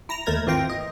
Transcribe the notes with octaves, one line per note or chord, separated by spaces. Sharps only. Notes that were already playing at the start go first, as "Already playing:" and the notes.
E4 A#5 A#6
D#2 A3 A#4 G#6 A#6
G#1 E3 C4 F4 G5 A#6
D#5